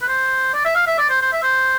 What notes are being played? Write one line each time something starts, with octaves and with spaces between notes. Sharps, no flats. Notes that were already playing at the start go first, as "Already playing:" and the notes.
B4
C5
D5
E5
F5
E5
D5
C5
C5
E5
C5